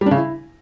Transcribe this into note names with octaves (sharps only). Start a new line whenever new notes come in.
G3
D4
C#3
E4